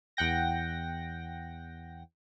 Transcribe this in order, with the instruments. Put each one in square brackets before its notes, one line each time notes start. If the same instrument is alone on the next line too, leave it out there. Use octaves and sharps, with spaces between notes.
[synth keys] E2 F#5 G5 A#6